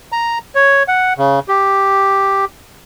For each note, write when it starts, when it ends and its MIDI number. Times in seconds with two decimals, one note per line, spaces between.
0.12 0.38 82
0.55 0.83 73
0.88 1.13 78
1.18 1.39 49
1.48 2.45 67